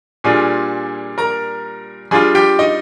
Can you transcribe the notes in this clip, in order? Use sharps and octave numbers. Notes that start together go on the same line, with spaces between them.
A#2 G3 D4 F4 G#4 G#5
A#4 A#5
G3 D4 F4 G#4 G#5
G4 G5
D#4 D#5